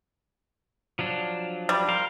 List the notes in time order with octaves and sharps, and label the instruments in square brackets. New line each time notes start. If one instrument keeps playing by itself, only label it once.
[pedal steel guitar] F3 F#3 D4
[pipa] G3
[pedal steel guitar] A#4 C5 F5